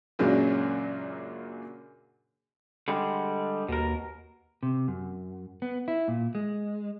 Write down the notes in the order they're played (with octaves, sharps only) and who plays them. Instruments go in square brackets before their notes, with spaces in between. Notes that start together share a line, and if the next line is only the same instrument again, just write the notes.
[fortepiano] F#2 A#2 C#3 F#3 G#3 D4
[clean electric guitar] D3 G3 G#3
[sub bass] D#2 [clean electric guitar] B2 A#4
[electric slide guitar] C3
F#2
B3
E4
A#2
G#3